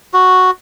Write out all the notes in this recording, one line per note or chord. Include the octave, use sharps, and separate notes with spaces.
F#4